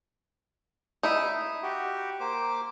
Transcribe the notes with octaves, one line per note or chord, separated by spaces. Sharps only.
D#4 E4
F#4 G4
A#3 C5 D6